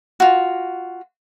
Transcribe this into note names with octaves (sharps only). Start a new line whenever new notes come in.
F4 F#4